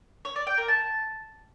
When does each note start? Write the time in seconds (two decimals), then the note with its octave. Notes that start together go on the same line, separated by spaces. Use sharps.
0.25 C#5
0.36 D5
0.47 G5
0.58 A#4
0.68 A5